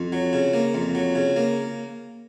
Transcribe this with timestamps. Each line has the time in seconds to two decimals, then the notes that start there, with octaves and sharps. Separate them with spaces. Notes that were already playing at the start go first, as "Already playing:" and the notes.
Already playing: F2
0.12 F#3
0.33 C#3
0.54 A#3
0.74 F2
0.95 F#3
1.15 C#3
1.36 A#3